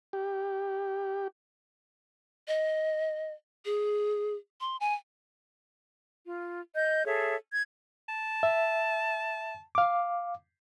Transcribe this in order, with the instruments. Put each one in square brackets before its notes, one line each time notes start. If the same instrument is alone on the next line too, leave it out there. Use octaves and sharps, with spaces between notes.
[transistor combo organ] G4
[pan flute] D#5
G#4
C6
G#5
[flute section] F4
D#5 G6
G#4 A4 C#5 E5
G#6
[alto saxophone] A5
[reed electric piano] E5
F5 D6